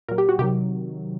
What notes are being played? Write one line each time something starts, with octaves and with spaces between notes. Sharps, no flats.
A#2 F#3 A#4
G4
F#4
C3 D#3 F#3 G4